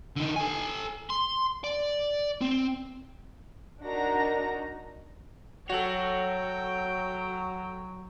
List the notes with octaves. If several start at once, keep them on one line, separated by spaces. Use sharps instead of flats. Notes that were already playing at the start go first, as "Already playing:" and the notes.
D3 D#4
A4 G#5
C6
D5
C4
D4 D#4 F#4 A#4 A#5 A#6
F#3 F#4 A4 C#5 F#5 G5